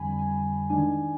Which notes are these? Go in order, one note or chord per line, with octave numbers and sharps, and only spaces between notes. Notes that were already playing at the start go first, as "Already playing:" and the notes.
Already playing: F2 D3 G3 G#5 B5
G#5
D#3 G#3 D4 G#5